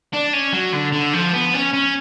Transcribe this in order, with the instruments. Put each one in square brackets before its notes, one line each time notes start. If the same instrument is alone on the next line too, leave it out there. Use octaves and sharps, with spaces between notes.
[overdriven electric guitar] D4
C#4
F#3
D3
D3
F3
B3
C#4
C#4